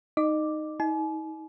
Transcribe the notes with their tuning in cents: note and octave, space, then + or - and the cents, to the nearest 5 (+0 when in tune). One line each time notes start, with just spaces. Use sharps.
D#4 +0 D#5 -30 D6 +0
D#4 +40 G#5 +45